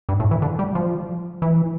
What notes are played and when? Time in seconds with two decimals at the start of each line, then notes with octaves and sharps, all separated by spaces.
0.09 G2
0.20 A2
0.31 E3
0.42 D3
0.59 G3
0.75 F3
1.42 E3